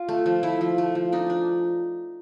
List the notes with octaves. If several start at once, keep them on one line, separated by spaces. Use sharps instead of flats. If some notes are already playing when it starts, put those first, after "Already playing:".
Already playing: F4
A3
F3
A3 E4
F3
A3
F3
D4 D#4
D4